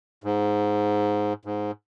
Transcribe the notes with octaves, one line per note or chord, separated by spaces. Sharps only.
G#2
G#2